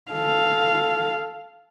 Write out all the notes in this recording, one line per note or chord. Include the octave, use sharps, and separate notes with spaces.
A4 F5